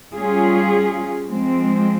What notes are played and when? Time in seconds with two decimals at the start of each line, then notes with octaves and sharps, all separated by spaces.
0.14 G3 C#4 F4 G#4
1.28 F3 G#3 C4